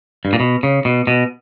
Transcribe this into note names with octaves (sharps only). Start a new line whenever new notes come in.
G2
A#2
B2
C#3
B2
B2